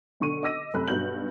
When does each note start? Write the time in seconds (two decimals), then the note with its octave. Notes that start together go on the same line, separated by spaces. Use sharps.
0.20 B1 D3 C#6 D#7
0.43 D#5 D6 E6 A#6 D#7
0.74 F#2 C3 A3 B5 F#6
0.88 B1 G2 F#4 G6 F#7